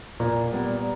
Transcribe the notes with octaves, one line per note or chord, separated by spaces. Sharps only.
A#2
G3 B3